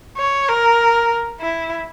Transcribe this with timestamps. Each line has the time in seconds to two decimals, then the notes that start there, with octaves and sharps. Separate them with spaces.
0.17 C#5
0.49 A#4
1.41 E4